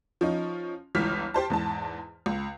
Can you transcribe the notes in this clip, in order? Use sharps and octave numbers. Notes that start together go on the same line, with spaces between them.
F3 C#4 D#4
G1 C#2 E3 F6 B6
G4 C5 A5
E2 G#2 A5
C#2